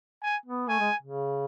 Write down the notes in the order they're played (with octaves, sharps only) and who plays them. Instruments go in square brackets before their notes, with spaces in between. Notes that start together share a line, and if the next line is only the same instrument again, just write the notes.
[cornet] G#5
[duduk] B3
[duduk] A3 [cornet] G#5
[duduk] G#3
C#3